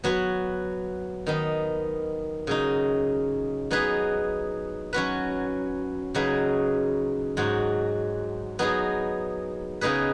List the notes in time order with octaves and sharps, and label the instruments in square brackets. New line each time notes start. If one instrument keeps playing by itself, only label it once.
[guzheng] F#3 B3 F#4 B4
D#3 B3 D#4
C#3 F#3 D#4
F#3 B3 D#4 G#4 B4
F#3 C#4 F#4 B4
C#3 F#3 D#4 G#4 B4
G#2 F#3 D#4 F#4
F#3 B3 D#4 G#4
C#3 B3 D#4 G#4 B4